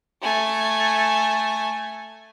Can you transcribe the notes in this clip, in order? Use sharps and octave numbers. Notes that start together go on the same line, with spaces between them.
A3 G#5